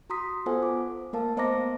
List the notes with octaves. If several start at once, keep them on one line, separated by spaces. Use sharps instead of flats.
F#4 A#5 C6 D#6 B6
B3 F4 A4 C5 F#5 G#5
D6
A3 A#3 A#4 F5 A5
B3 C5 D#5 A#5 D6 A#6